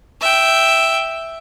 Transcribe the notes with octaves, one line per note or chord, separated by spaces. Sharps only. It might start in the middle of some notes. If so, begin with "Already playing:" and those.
E5 G5